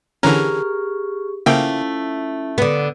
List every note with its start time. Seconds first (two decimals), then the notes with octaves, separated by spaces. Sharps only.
0.23 D3 E3 C#4 G4 G#4 A#4 C#6
1.46 C#3 F3 A3 A#3 C#4 E4 G5
2.58 D3 B3